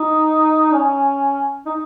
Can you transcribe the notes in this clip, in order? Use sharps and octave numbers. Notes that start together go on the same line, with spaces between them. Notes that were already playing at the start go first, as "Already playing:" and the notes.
Already playing: D#4
C#4
D#4